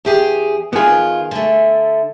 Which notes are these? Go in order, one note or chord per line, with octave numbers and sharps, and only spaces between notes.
E2 G4 G#4
D#3 B3 F4 G#4
D3 A3